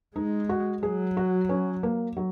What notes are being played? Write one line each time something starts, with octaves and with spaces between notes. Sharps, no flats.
G#3 D#4
F#4
F#3 G#4
F#4
C#4
A#3
F#3